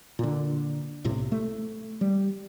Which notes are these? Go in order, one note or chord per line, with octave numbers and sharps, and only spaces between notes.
A#2 D3
B1 A2 C3
A3
G3